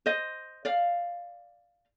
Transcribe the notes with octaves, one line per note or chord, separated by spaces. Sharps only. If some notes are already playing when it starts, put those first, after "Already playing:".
C5 D#5
D5 F5